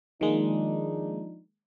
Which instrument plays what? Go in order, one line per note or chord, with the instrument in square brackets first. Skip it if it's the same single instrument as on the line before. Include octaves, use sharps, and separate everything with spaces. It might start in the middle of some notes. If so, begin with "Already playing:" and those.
[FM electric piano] D#3 G#3 A#3 [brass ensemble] F3 D4 D#4